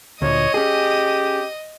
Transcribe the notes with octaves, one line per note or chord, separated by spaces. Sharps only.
D2 A#2 C#5 D#5 D#6
C#4 G4 G#4